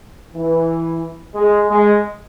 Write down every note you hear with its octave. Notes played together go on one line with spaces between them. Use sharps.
E3
G#3
G#3